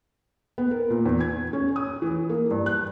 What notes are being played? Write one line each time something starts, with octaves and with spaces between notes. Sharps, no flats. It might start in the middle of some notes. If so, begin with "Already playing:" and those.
B3
A#4
A#2
E2
G#6
C#4
D#6
E3
A#3
G2
F#6